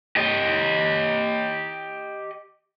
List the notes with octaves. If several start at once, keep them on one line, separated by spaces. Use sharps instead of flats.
G4 D#5